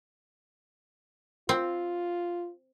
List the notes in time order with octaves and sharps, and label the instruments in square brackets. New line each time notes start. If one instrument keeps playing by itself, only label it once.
[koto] C4 [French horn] F4